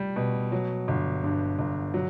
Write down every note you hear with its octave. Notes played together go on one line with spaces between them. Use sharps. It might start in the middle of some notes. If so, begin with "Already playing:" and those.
Already playing: G3
B2
F#3
G1
G2
G1
F#3